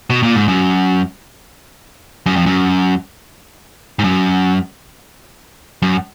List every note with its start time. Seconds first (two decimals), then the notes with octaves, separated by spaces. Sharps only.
0.10 B2
0.23 A#2
0.36 G#2
0.48 F#2
2.26 F#2
2.36 F2
2.46 F#2
3.99 G#2
4.04 F#2
5.82 F#2